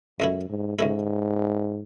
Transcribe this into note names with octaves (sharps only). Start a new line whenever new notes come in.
C#2 F#2 B2 A3 E4
G#2
C#2 G#2 B2 A3 E4